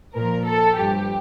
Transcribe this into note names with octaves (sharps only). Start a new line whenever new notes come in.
A#2 F3 A#4
A4
G2 F3 G4